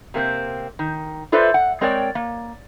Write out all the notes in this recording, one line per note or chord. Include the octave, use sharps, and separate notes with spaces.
C3 A#3 C4
D#3
F4 A4 B4 C5 D5 E5
F#5
G#3 C4 A#4 C#5 D5 G5
A#3